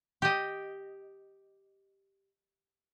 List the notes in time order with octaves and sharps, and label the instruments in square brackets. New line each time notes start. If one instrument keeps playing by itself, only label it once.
[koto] G4 D#5